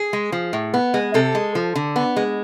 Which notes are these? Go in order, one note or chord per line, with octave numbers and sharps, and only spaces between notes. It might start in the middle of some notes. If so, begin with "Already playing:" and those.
Already playing: G#4
G#3
F3
A2
B3
G#3
C3 A4
G#3
F3
D3
B3
G#3